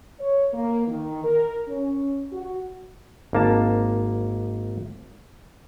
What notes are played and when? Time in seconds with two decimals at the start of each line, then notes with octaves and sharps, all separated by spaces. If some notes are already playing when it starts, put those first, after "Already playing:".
0.19 C#5
0.53 A#3
0.87 D#3
1.24 A#4
1.68 C#4
2.32 F#4
3.33 G#1 A#3 A5